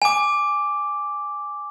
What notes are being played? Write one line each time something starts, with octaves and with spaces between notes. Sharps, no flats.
G#5 D6